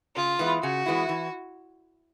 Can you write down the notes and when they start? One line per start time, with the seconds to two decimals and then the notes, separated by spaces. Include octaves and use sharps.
0.16 C#3 F4
0.39 E3 G#3 B3 E4
0.63 C#3 F#4
0.86 E3 G#3 B3 E4
1.09 E3